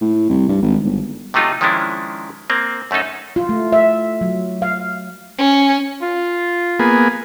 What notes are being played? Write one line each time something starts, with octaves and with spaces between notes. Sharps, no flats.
A2
C2
G2
G#1
G1
C3 F#3 A3 D#4 F4
D#3 F3 G#3 C#4 D4 E4
A#3 C4
F#2 A3 C#4 D#4 A4
F4
A3
E5
F#3
F5
C#4
F4
A#3 B3 G#4